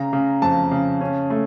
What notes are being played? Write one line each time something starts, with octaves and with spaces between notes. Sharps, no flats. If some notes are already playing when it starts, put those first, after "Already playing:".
Already playing: C#3 A#5
C#3
F2 A5
C#3
C#4
A3